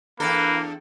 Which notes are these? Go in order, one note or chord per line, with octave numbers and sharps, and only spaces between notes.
E2 A#3 D4 A4 B4